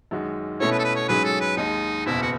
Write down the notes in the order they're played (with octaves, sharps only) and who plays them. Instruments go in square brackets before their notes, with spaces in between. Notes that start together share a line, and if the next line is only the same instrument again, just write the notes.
[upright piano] F#2 D#3 G#3 D#4 F#4
[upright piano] B2 A3 C#4 E4 [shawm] C#5
[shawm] B4
A4
B4
C#5
[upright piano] G#2 F#3 C#4 G#4 [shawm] B4
[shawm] A4
B4
[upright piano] D#2 D#3 G#3 [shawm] D#4
[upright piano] F#1 E2 B2 [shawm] E4
[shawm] F#4